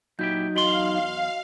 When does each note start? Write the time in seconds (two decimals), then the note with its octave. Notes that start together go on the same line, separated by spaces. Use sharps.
0.19 A#2 F#3 D#4 E4 G4 G6
0.55 E2 F#4 D#5 F5 C6 F#7